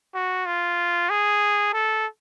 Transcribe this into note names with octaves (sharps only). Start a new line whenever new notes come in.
F#4
F4
G#4
A4